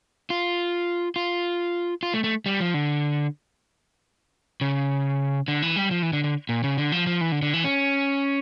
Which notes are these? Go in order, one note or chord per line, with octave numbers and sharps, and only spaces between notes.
F4
F4
F4
A3
A3
G3
F3
D3
C#3
D3
E3
G3
F3
E3
D3
D3
A#2
C#3
D3
F3
F3
E3
D3
D3
E3
C#4